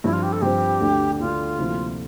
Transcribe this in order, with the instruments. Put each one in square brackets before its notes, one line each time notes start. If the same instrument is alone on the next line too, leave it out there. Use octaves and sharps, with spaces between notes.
[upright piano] G2 F3 C4 [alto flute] E4
[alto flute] F4
G4
A4
[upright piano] G2 F3 C4 [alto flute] G4
[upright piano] D2 D3 A3 D4
[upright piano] D2 D3 A3 D4 [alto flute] F4
[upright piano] D2 C3 F3 A#3 E4